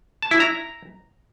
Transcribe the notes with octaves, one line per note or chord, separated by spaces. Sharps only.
A5
E4
A#5